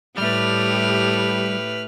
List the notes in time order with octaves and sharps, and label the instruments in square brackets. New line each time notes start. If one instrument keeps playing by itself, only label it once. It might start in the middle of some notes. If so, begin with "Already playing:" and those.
[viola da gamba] A2 A3 G4 [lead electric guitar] G3 [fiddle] B4 F6